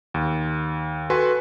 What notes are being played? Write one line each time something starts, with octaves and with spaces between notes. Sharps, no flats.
D#2
F#4 A4 B4 G#5 C6